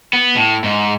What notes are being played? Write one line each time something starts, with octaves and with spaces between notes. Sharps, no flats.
B3
A2
G#2